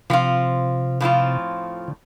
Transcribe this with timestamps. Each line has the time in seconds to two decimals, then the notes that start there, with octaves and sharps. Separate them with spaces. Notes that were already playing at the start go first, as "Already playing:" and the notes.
0.10 C3 F3 C4 F4
1.01 A2 F3 C4 F4
1.88 D3